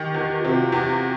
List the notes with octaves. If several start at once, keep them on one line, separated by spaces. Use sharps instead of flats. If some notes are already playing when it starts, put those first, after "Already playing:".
Already playing: D#3 G4
E2
F4
C3 F#4
E2 G4
G4
F#4